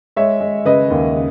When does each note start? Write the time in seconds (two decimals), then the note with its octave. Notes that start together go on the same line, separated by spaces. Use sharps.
0.16 G#3 C#5 E5
0.40 G#3
0.65 C#3 B4 D#5
0.90 D#2
1.15 C#3